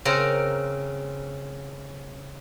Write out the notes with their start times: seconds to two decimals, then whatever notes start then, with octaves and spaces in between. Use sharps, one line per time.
0.05 C#3 C4 A#4